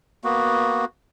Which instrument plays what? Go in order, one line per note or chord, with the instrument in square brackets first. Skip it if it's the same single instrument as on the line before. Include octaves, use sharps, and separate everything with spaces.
[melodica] A#3 B3 F#4